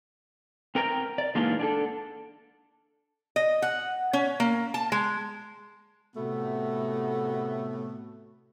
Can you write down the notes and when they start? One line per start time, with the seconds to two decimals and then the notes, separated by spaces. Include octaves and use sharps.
0.75 C4 A#4 G5 A#5
1.18 D5
1.35 E3 G#3 A#3 D4 D#4 F4
1.59 D4 G#4 A4
3.36 D#5
3.62 F#5
4.13 C#4
4.40 A#3
4.74 A5
4.92 G#3
6.16 A2 C3 A3 B3 F#4